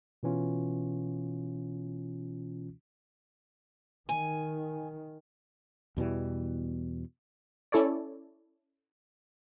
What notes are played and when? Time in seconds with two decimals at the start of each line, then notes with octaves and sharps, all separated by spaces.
0.23 B2 E3 C#4 F4
4.09 D#3 G#5
5.97 E2 B2 E3 G3
7.72 C#4 E4 A4 C#5 D5